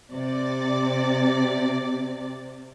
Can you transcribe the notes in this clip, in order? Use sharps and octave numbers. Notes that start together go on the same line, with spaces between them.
C3 D5